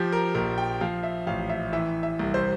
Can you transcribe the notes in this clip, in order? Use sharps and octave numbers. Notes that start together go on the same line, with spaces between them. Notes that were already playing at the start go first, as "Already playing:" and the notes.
Already playing: F3 G4
A#4
A#1 A#4
G5
F3 F5
E5
A1 F5
E5
E3 E5
E5
C2
C5